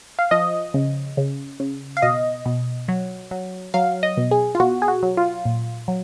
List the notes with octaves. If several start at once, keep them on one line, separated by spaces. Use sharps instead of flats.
F5
F3 D#5
C#3
C#3
C#3
F5
B2 D#5
B2
F#3
F#3
F#3 F5
D#5
B2
G#4
F4
B2 F#4
G#4
F#4
F#3
F4
A#2
F#3